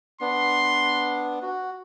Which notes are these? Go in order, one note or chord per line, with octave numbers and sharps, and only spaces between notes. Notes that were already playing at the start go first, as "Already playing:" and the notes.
B3 D4 C6
F#4